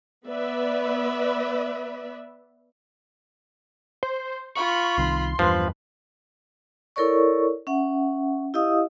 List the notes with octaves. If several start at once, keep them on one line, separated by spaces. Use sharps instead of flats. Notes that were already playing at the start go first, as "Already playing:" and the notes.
B3 B4 D5 E5
C5
F4 B5 C#6
C2 C3 D#3 C6
E2 G2 F3 B4
E4 A4 A#4 C#5 D5 C#6
C#4 E5 F#5
E4 G4 D#5 F5 D#6